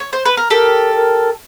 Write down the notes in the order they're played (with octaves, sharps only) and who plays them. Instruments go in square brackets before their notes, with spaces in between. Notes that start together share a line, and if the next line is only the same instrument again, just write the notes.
[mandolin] C#5
C5
B4
A#4
[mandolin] G4 A4 [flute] A#4
[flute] A#4